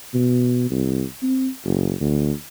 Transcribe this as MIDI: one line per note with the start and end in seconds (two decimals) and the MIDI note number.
0.14 0.68 47
0.70 1.04 36
1.23 1.49 60
1.65 1.93 30
2.01 2.32 38